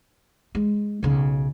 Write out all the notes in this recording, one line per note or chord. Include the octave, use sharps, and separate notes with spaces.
G#3
B1 C#3